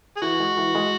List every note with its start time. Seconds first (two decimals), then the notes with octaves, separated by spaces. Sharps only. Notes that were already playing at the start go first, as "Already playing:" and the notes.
0.17 G#4
0.22 E3 F#4
0.39 G#3
0.57 E3
0.75 G#3